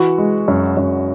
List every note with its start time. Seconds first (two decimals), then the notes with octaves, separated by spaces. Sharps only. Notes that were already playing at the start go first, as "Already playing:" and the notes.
Already playing: E3 F#4
0.18 G#3
0.48 F#2
0.77 F#2